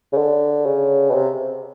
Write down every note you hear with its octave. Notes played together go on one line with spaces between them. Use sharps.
C#3
D3
C#3
B2
C3